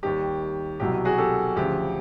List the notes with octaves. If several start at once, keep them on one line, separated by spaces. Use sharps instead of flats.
D#2 D#3 G3 G4
C2 B2 F#3 G4
F#4 G#4
G4 A4
D2 C#3 F3 G4